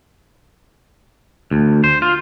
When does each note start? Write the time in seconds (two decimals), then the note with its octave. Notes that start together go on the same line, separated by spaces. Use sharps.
1.51 D2
1.84 C5
2.02 F4